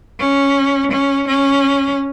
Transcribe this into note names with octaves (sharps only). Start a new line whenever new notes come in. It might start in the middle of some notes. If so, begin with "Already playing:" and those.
C#4
C#4
C#4